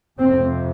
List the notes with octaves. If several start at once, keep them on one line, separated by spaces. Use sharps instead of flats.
F2 C3 C4